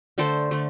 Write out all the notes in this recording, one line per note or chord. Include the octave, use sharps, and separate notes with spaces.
D3 A3 A4 C5
D3 A3